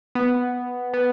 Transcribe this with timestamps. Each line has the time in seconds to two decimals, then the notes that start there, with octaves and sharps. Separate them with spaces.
0.15 B3
0.94 B3